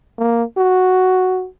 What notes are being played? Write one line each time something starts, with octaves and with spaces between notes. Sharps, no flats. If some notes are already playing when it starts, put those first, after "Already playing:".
A#3
F#4